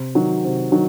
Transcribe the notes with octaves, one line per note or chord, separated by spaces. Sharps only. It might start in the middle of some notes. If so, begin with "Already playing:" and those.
Already playing: C3 C5
D#3 F#3
C3
D#3 F#3